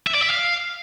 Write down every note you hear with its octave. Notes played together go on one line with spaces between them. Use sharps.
E5
D5
E5
F5